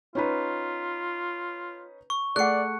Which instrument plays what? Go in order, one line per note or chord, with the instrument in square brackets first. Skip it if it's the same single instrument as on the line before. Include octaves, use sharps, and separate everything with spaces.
[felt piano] C#4 D#4 B4 [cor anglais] F4
[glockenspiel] C#6
[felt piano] A3 [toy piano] G#4 F#5 [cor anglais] D5 [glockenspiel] F#6 C#7